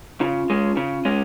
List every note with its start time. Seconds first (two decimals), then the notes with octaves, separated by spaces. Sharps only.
0.21 C#3 F4
0.50 G#3 C#4
0.77 C#3
1.05 G#3 C#4